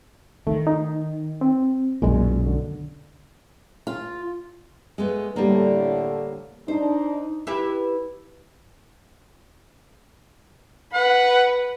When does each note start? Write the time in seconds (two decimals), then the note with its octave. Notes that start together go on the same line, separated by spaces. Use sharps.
0.47 D#3 A3
0.67 D#4
1.41 C4
2.02 B1 F#2 A#2 G#3
2.46 D3
3.87 F4
4.98 G#3 A3 B3
5.36 A2 D3 G3 A#3
6.68 D4 D#4 C5
7.47 E4 G4 B4
10.93 B4 F#5